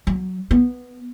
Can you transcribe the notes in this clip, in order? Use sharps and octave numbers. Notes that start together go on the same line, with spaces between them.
F#3
B3